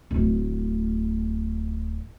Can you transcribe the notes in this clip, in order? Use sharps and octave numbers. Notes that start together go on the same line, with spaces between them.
D1 A3